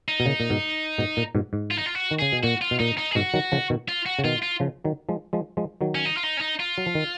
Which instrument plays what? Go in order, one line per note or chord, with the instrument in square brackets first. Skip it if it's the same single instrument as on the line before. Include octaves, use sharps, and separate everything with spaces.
[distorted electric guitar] D#4
[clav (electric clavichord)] B2
A#2 C#3
A#2
G#2 B2
G#2 B2
A#2
G#2 B2
G#2
[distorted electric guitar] F4
D#4
F4
F#4
[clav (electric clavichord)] D#3
[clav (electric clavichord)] C#3 [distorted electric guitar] G#4
[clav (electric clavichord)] B2
[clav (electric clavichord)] A#2 [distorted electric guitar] F#4
[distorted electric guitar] F4
[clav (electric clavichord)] B2
[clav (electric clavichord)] A#2 [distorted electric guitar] D#4
[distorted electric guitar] D#4
G#4
[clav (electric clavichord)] G#2 B2 [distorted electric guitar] F#4
[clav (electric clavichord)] D#3 F#3
C#3 F3
B2 D#3
[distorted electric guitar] F4
F#4
[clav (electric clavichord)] C#3
[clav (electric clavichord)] B2 D#3 [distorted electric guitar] F4
[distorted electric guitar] F4
[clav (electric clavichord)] C#3 F3
D#3 F#3
F3 G#3
F3 G#3
F3 G#3
D#3 F#3
[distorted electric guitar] C#4
D#4
F4
D#4
C#4
D#4
F4
[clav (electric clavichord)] F#3
F3
D#3